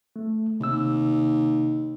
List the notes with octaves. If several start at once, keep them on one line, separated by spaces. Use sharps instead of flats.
A3
D#2 C3 E6